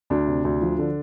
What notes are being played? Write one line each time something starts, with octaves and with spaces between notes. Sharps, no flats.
D2 D4
C3
D2
F3
D3